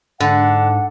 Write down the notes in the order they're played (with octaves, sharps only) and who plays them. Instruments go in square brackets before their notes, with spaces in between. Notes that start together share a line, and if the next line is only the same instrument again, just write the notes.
[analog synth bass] G#2 [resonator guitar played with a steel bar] D3 [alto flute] F#5